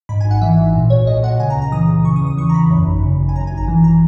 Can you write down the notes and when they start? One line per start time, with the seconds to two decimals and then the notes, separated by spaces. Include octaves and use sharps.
0.09 G#2 B5
0.21 G#1 G#5
0.31 F#5
0.41 E3 E5
0.58 G#1
0.74 A#2
0.90 B1 C#5
1.07 B1 D#5
1.23 A#2 F#5
1.40 C#3 G#5
1.50 A#5
1.55 C#2
1.62 A#5
1.72 E3 D#6
1.88 C#2
2.05 C#3 C#6
2.16 D#6
2.21 E2
2.27 D#6
2.37 E3 C#6
2.49 A#5
2.54 E2 B5
2.70 F#2
2.87 G#1
3.03 C#3
3.20 G#1
3.29 G#5
3.36 F#2 A#5
3.47 G#1 G#5
3.57 A#5
3.68 E3
3.84 A#5